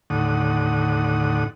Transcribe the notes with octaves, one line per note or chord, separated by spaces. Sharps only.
D#2 A2 D3 F#5 D#6